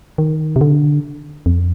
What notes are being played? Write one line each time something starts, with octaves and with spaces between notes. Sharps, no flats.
D#3
C3
D3
F2